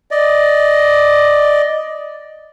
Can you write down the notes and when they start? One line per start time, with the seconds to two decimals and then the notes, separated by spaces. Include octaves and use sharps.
0.11 D5 D#5